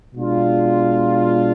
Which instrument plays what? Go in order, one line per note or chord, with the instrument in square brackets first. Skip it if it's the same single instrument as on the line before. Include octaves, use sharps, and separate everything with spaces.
[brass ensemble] B2 G#3 D4 F4